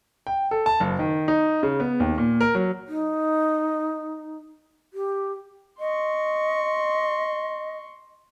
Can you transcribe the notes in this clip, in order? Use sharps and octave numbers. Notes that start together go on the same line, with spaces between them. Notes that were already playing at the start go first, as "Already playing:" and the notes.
G5
A4
A5
F#1
D#3
D#4
C#3
B3
D#2
A#2
A#4
F#3
D#4
G4
D#5 C6 C#6